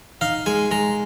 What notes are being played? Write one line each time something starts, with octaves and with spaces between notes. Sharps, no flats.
D#4 F5
G#3 G#5
G#3 A#5